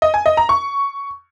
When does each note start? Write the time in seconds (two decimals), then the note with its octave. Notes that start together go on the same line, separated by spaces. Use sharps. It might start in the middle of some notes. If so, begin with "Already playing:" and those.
0.02 D#5
0.14 G#5
0.26 D#5
0.37 A#5
0.49 C#6